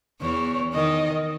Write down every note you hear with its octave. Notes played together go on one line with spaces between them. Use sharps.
E2 E3 C#5
D#3 D#5